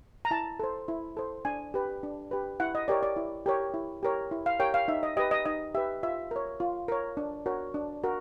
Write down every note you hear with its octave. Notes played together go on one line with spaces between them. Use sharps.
A#5
E4 A5
A4 C5
E4
A4 C5
D4 G#5
G4 B4
D4
G4 B4
E4 F#5
D#5
G4 A#4 C#5 D5
D5
E4
G4 A#4 C#5
E4
G4 A#4 C#5
E4
F5
G4 A#4 C#5 G5
F5
D#4 E5
D#5
G4 B4 D#5
D#5
D#4 D#5
G4 B4 E5
F4 E5
A#4 C#5
F4
A#4 C#5
D4
F#4 A#4 C#5
D4
F#4 A#4